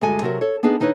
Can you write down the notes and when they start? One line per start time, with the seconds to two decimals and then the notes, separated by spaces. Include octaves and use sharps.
0.01 D2 G2 G#3 A4 G#5
0.21 C3 F#3 F#4 A#4
0.41 A4 C#5
0.63 B3 D4 D#4 G#4 B4
0.80 D#3 D#4 E4 B4 C#5